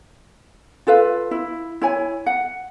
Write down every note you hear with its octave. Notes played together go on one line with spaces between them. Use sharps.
F4 A4 B4 F5
E4
E4 C#5 G#5
F#5